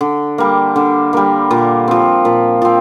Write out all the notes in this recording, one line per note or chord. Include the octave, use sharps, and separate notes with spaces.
D3
G3 A#3
D3
G3 A#3
A#2
F3 C4
A#2
F3 C4